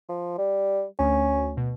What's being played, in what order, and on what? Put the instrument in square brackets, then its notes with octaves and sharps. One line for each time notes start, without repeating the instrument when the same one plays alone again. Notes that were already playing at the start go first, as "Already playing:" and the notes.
[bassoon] F3
G3
[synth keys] D2 [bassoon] C#4
[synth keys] B2